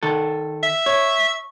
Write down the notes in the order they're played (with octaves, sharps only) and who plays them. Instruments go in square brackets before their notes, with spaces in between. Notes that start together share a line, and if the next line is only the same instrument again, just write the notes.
[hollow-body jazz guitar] D#3 A4
[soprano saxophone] E5
[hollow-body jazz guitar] C#5